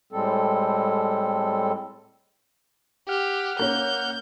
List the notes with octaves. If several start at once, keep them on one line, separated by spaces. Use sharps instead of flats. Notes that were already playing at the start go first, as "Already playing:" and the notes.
A2 G3 G#3 C4 A4
G4 F#5 F6
A#3 C#4 G6